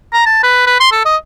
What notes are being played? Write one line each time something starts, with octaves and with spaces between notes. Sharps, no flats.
A#5
A5
B4
B4
C6
A4
D#5